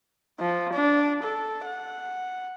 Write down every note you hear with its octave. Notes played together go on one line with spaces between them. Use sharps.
F3
D4
A4
F#5